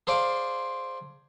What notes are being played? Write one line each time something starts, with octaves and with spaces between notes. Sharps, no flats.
G#4 A4 C5 D5 F5 D6